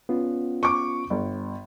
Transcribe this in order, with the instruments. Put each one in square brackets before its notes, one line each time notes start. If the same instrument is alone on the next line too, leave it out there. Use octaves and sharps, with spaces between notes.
[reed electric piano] B3 C#4 F4
[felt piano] C#6 D6
G1